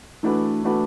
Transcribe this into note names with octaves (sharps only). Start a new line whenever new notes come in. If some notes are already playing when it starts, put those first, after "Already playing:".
E3 A3 D4 F#4 B4
E3 A3 D4 F#4 B4